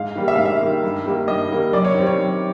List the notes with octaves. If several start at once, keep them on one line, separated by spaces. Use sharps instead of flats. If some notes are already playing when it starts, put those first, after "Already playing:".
Already playing: G#2 F5
D#3 G3 A#3
E5
G#2 F5
E5
D#3 G3 A#3
G2
D#3 G3 A#3
G2 D#5
D#3 G3 A#3
F#2 D5
C#5
D#3 G3 C4
C#5
F#2